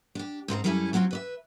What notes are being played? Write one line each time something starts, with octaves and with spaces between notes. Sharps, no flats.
D4 G4
G#2 C4 B4 A#5
F#2 G3 C#4 E4 F#4 A4
F#3 B3 C4 F4 F#4
B4 D5 E5